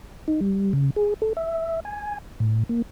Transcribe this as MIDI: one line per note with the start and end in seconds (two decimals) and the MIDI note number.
0.28 0.40 63
0.41 0.73 55
0.73 0.90 49
0.96 1.14 68
1.22 1.33 69
1.37 1.80 76
1.85 2.18 80
2.40 2.63 45
2.69 2.82 58